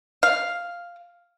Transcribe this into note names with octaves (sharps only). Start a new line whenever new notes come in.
F5